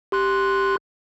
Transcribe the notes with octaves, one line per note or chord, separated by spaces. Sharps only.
G4 C6 F#6